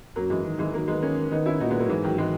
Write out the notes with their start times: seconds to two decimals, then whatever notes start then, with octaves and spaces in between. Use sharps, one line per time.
0.15 F#2 F#3 A#3
0.30 E3 G#3
0.45 D#3
0.59 E3 G#3
0.73 D#3 F#3 A#3
0.88 G#3 B3
1.02 A#3 C#4
1.31 D#3 B3 D#4
1.46 C#4 E4
1.60 A#2 D#4 F#4
1.70 G#3 B3
1.79 F#3 A#3
1.90 G#2 E3
2.04 D#3 F#3
2.18 E3 G#3